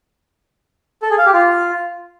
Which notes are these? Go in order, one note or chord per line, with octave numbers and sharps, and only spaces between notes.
A4
G#4
F5
G4
F4